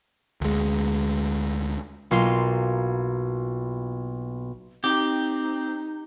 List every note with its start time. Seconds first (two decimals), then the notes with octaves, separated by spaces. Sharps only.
0.41 D2 G#3
2.11 B1 A#3 F4 C6
4.84 C4 D#4 G4